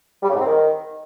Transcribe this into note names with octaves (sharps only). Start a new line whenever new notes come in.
G3
C#3
G#2
C4
D#3